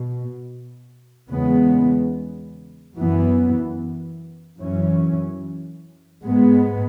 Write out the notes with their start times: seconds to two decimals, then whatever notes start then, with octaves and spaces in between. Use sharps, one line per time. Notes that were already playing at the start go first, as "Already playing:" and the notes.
Already playing: B2
1.31 E2 C#3 G#3 B3
2.96 F#2 E3 B3
4.59 F#2 E3 C#4
6.23 G#2 G#3 B3